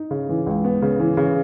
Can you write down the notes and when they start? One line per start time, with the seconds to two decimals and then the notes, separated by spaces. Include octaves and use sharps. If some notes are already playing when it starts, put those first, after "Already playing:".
Already playing: D#4
0.11 C#3
0.29 E3
0.46 C#2
0.64 B3
0.82 C#3
1.00 E3
1.17 C#3